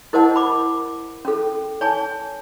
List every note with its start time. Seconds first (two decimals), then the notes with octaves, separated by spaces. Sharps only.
0.13 E4 A#4 C5 D#5 F#5 A5
0.36 B5 D6
1.25 C#4 A4
1.81 C#5 G#5 A5